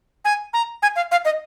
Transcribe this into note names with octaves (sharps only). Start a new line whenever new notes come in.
G#5
A#5
G#5
F5
F5
D#5